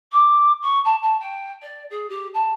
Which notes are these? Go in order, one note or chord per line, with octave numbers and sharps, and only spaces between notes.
D6
C#6
A5
A5
G5
D5
G#4
G4
A5